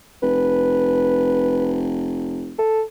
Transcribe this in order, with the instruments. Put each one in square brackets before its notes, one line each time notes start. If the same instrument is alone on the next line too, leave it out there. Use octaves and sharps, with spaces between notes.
[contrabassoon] F1 [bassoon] B4
[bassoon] A4